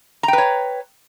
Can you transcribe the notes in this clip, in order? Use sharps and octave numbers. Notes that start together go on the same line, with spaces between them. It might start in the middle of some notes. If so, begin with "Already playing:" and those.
B4 C#5 G5 A#5